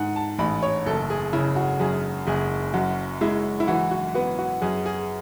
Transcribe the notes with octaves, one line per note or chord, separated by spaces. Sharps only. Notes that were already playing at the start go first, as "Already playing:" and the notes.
Already playing: G#2 D#3 F#5 G#5
A5
A1 B5
C#5
F#1 A4
G#4
C#3 E4
F#4
F#2 G#4
F#1 G#4
F#2 F#4
G#3 E4
E4
E3 F#4
F#4
B3 F#4
F#4
F#2 G#4
G#4